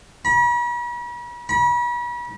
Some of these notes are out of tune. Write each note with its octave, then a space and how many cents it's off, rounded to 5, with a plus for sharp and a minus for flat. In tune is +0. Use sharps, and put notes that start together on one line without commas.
B5 -45
B5 -40